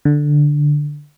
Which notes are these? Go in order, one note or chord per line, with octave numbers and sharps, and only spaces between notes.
D3